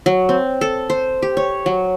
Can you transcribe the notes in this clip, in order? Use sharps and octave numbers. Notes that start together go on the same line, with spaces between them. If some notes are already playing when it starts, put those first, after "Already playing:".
F#3
C4
A4
C5
G4
C#5
F#3